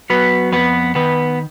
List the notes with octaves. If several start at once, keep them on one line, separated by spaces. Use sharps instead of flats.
F#3 B3 B4
F2 B3 B4
D#3 B3 B4